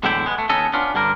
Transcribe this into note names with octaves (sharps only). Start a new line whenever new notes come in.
E2 A2 D3 G#3 E4 G5
G#3 B3
A3
D#2 B3 C#4 A4 D#5
B3 C#4 D4 F4
G2 D3 G3 A#4